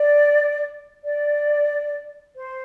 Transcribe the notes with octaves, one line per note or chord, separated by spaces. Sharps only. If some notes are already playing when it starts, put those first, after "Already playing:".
Already playing: D5
D5
C5